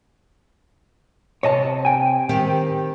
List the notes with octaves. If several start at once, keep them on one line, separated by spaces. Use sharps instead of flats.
C3 C#5 D#5 A5
G5 G#5
D#3 C4 G4